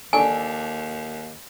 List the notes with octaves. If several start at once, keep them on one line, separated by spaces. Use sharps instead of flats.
D#2 D4 A4 G#5